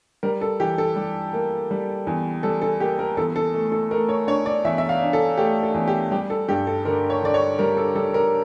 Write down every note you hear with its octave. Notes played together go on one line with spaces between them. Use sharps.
G3 A#4
A4
E3 G4
A4
G3
A#3
G3
E2
G3 A4
A4
A#3 G4
A#4
E2 A4
A4
A3
A4
A3 A#4
C#5
D4 C#5
D5
E2 E5
E5
F5
D4
A4
A3 G4
A4
E2
G4
G3 G4
A4
G2 G4
A4
D3 A#4
C#5
D3 D5
C#5
G3 A#4
A4
G3 A4
A#4